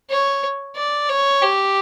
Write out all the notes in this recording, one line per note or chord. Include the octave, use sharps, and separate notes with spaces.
C#5
D5
C#5
G4